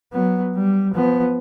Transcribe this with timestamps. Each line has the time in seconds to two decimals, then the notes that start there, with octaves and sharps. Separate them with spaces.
0.13 F#3 B3
0.55 G3
0.94 F3 B3